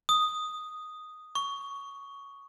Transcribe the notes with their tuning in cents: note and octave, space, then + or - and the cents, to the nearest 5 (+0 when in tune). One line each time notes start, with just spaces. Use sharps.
D#6 +0
C#6 +10